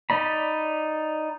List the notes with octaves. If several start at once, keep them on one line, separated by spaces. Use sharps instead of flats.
D#4 D5 B5